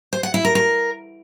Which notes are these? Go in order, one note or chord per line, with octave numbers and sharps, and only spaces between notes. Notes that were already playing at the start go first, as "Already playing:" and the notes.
C5
F#5
E4
A#4
A#4